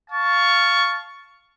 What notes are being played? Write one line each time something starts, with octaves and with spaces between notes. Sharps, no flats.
F5 A5 C#6